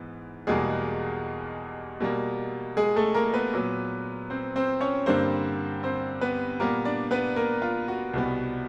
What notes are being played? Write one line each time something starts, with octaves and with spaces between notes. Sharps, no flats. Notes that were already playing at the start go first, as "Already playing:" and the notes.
Already playing: G#2 E3 B3
E2 B2 G3 G#3 A#3 G#4
B2 G3 A#3
G#3 G#4
A3 A4
A#3 A#4
B3 B4
A#2 F#3 B3
C4 C5
C4 C5
C#4 C#5
G2 D3 G3 A#3 C4 C5
C4 C5
B3 B4
A#2 G3 A#3 B3 A#4
D4 D5
B3 B4
A#3 A#4
F4
F#4
C2 B2 G3 B3